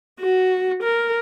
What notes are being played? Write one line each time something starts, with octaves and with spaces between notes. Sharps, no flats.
F#4
A#4